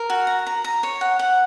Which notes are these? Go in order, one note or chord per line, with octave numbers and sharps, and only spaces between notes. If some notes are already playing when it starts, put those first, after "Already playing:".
Already playing: A#4
F#4
A#5
A#5
A#5
C#5
F#5
F#5